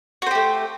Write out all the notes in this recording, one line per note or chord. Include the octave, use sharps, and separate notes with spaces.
A3 F#4 G4 C5